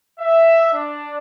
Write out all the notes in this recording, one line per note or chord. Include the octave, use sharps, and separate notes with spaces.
E5
D4